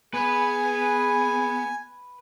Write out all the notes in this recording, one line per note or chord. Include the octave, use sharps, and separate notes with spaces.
B3 G#4 B4 G#5